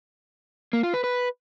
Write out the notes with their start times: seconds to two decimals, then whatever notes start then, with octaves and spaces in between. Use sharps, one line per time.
0.73 A#3
0.83 F4
0.94 B4
1.04 B4